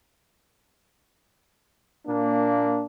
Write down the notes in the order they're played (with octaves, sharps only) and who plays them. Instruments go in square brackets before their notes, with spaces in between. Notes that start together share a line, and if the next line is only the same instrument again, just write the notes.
[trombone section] A#2 A#3 D4